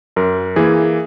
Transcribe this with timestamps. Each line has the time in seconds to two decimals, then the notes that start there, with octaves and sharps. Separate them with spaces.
0.16 F#2 A#4
0.56 E3 A#3 G#4